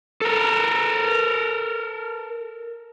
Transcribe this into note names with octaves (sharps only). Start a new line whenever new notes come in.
A4 A#4